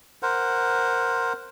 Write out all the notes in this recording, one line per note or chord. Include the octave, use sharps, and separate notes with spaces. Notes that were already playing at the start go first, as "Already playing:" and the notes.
A#4 C5 F#5